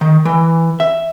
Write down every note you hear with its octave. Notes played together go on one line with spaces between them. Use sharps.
D#3
E3
E5